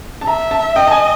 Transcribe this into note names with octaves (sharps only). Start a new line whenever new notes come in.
A5
E5 A#5
A5
D#5 G5
A5
G#5